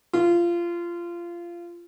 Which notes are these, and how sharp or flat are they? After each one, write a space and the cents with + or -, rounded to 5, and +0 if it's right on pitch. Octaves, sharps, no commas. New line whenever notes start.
F4 -20